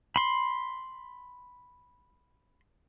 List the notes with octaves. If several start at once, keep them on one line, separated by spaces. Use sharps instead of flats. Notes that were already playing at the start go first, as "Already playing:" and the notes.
B5 C6